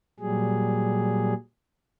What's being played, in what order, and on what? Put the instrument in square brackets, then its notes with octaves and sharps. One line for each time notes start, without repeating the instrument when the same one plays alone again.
[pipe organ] A#2 F#3 G3 G#4